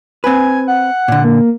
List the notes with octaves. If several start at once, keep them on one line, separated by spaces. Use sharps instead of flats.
C4 B4 G#5
F#5
A#2 D3
A#3